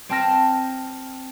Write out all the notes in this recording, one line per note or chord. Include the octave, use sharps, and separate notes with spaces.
C4 G5 A5 F6 A#6